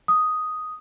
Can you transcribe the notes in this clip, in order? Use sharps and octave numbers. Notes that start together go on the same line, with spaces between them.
D#6